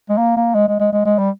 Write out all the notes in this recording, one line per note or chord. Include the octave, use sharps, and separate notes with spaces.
G#3
A#3
A#3
G#3
G#3
G#3
G#3
G#3
G3